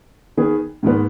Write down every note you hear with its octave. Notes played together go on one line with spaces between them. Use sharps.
D#3 B3 G#4
G#2 D#3 G#3 B3